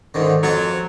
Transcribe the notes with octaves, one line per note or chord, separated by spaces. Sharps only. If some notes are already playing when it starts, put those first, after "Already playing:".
G#2 D3 D#3
F2 F#3 F4 C#6